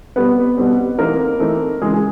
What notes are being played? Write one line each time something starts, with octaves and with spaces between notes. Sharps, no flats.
B2 G3 B3 C4 B4
B2 G3 C4
E3 A3 A#3 C4 D#4 A#4
E3 A3 C4 D#4
C#3 E3 G#3 G#4
G#4